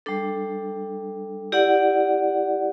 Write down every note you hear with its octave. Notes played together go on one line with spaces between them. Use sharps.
G3 D4 A4
E4 G4 D5 F#5